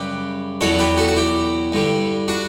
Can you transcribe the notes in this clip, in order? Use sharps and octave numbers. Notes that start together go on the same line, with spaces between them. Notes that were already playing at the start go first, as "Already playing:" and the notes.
Already playing: F#2 C#3 G3 G4 B4
E2 B2 F#3 A4 C#5
G4 B4
F#4 A4
F#4
E4 G4
G2 D3 G3
D4 F#4